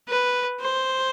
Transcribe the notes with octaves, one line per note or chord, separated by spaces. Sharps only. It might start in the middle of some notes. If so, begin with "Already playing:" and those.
B4
C5